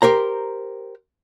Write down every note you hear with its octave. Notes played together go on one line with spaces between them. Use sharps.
G4 A#4 C5 A#5